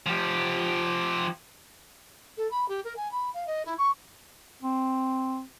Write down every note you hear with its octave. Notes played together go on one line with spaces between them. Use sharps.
F3 G4
A4
B5
G4
A#4
G#5
B5
F5
D#5
E4
C#6
C4